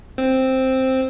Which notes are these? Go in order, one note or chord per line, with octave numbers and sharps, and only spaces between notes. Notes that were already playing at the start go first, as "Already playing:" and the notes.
C4